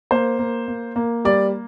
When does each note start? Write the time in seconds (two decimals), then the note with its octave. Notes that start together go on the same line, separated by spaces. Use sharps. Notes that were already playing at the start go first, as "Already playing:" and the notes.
0.11 A#3 C5
0.39 A#3
0.68 A#3
0.96 A#3
1.25 G3 D5